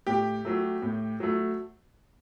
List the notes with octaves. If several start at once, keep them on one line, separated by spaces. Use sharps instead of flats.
A2 G4
F#3 A3
A2
F#3 A3